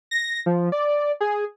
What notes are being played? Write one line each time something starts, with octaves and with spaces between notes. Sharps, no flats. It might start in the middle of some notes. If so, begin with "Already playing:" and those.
A#6
F3
D5
G#4